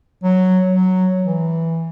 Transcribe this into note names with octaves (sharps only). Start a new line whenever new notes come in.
F#3
F#3
E3